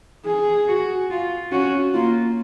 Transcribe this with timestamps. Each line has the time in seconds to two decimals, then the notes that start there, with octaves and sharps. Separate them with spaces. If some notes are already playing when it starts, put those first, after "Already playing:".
0.25 G#4
0.68 F#4
1.11 F4
1.52 C#4 F#4
1.94 A#3 F4